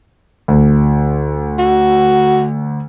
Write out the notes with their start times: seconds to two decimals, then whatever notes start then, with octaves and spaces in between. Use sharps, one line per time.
0.48 D2
1.59 F#4